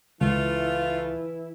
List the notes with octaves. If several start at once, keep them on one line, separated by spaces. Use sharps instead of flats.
C#2 E3 A3 E4 F4